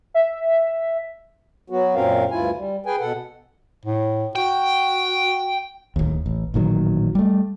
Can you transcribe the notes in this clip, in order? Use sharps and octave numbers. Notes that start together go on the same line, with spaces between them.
E5
F#3 B3 F#4
F#2 A#2 C4 C#4 A#4 F5
D2 G2 E4 F4 G#5
G3
G#4 B4 G5 G#5
B2 A4 F#5
A2
F#4 G5
D1 D#2
A1
A1 A#2 D#3 F#3
G3 A3